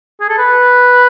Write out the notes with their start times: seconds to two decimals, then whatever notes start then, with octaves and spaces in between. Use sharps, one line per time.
0.21 G#4
0.29 A4
0.38 B4